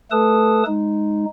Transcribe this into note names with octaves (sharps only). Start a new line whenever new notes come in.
A3 A4 B4 A5 D#6
G#3 D#4